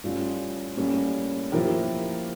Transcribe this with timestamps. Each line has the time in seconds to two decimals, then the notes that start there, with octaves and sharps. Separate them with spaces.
0.04 A2 G3 C#4 F4
0.77 A2 G3 A#3 C#4
1.52 F3 A#3 E4 G4 A#4